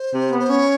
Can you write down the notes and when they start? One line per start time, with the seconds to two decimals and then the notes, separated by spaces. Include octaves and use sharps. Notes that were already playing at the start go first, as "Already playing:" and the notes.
Already playing: C5
0.11 C3
0.30 B3
0.39 C5
0.50 C#4 C#5